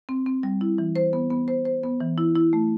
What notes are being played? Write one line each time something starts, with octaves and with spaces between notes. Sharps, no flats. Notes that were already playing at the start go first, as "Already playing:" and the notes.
C4
C4
G3
E4
E3
C5
B3
B3
C5
C5
B3
E3
E4
E4
A3